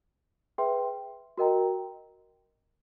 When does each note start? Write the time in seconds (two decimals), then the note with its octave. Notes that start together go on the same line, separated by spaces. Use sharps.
0.58 G#4 B4 E5 G5 C6
1.37 F#4 A#4 D#5 G5 A#5